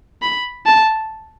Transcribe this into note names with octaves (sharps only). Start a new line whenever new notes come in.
B5
A5